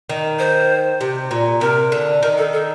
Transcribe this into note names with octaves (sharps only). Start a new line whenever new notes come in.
D#3
C5
C3
A#2
C3 A#4
D3
D#3 A#4
A4
A4